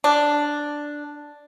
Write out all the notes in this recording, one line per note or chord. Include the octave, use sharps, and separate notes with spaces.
D4